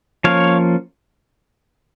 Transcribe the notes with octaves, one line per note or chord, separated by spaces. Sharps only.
F3 A#3 C#4 C#5 F5